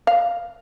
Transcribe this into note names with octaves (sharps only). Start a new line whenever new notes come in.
F5